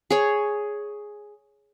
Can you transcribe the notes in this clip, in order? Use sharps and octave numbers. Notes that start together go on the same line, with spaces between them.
G#4 C#5